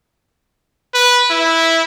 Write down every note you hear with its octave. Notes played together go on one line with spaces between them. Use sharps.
B4
E4